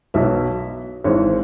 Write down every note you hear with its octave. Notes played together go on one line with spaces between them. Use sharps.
B1 B2 F#3 E5
G#1 G#2 E3 C#5